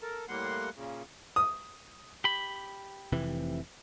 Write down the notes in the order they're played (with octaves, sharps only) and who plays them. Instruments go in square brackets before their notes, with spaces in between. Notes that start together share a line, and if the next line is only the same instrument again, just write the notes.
[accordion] A4 A#4
A2 G3 A#3 F#5 C6
A#2 C#3
[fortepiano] D#6
[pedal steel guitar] G4 B5
[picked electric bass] F1 C3 E3